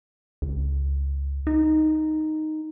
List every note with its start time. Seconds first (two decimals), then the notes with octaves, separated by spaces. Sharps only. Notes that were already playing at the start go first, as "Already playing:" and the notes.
0.42 C#2
1.47 D#4